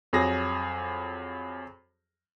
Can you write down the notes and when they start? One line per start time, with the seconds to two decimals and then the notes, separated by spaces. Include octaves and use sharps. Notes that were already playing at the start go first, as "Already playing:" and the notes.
0.13 F2 F#3 G#4 A#6